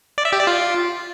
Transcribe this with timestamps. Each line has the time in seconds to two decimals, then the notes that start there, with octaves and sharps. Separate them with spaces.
0.18 D5
0.25 E5
0.32 G4
0.40 D5
0.47 F4